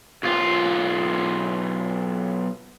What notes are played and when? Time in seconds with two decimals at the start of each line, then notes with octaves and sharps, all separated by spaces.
0.23 B1 F4